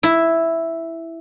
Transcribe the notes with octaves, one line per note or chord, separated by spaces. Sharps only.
E4